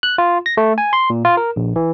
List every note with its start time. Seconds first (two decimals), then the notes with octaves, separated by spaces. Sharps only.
0.03 F#6
0.18 F4
0.46 A#6
0.57 A3
0.78 G#5
0.93 C6
1.10 A#2
1.25 F4
1.37 A#4
1.56 A#1
1.76 E3